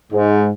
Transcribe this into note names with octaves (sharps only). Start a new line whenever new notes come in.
G#2